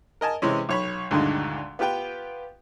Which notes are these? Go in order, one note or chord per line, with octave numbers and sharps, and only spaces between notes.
A#4 D#5 G#5 A5
C3 E3 G#3 C#4
B1 C#5 B5
D2 G2 A#2 D3 D#3 G#3
B3 F4 G4 B4 G5